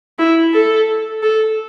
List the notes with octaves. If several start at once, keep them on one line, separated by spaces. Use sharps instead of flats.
E4
A4
A4